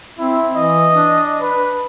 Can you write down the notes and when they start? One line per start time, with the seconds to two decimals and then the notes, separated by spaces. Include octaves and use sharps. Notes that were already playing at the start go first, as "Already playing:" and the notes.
0.18 C4 E4
0.55 E3 D#5
0.93 D4
1.41 B4